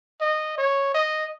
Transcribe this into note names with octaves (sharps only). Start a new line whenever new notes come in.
D#5
C#5
D#5